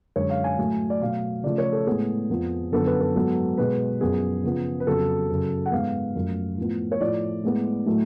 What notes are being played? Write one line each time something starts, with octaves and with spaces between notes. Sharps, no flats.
F#2 D3 G#3 C#5
F5
G#5
A2 F#3 A3
D5
B2 F#3 A3 F5
C#3 F3 A3 D5
C#5
A4
A2 G#3 B3 G#4
F2 F3 B3
F#2 D3 F3 B3 A4
B4
A4
G#2 F#3 B3
B2 G#3 B3 B4
F#2 F3 B3 G#4
C#3 F3 B3
B4
F2 C#3 F#3 B3 A4
F#2 C#3 F#3
F#5
G#2 G#3 B3 F5
F#2 F3 A3
A2 F3 B3
C#5
A2 F3 A3 D5
A2 G#3 B3
A2 F#3 A3